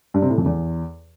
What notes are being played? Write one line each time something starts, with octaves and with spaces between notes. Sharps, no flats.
G2
C3
A2
F2
E2